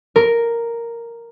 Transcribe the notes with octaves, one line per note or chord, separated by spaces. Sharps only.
A#4